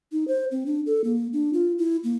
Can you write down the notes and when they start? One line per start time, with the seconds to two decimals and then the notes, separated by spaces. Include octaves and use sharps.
0.12 D#4
0.27 C5
0.51 C4
0.66 D4
0.86 A4
1.04 A#3
1.33 D4
1.53 F4
1.78 E4
2.04 A#3